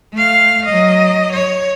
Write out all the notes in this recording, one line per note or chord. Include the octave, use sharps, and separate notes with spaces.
A3 F5
F#3 D#5
C#5